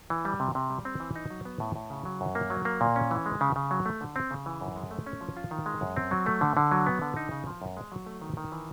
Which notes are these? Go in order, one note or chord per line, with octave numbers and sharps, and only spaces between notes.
E3
G3
C3
C3
G3
C4
E3
D#4
F#3
B3
A2
A2
C#3
F#3
F#2
A#3
F#3
A#3
A#2
C#4
E3
G#3
C#3
C#3
F#3
A3
D3
C4
C#3
E3
F#2
G#3
A3
C#4
F3
F4
D#3
G#3
F#2
C4
F#3
A3
D3
D3
F#3
B3
D3
D#4
C#3
F3
F#2
G#3
F#3
A3
D#3
D#3
E3